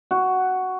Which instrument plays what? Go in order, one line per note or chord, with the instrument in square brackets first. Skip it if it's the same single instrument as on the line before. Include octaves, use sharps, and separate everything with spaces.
[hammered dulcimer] F#4